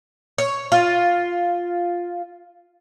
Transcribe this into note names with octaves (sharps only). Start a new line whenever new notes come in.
C#5
F4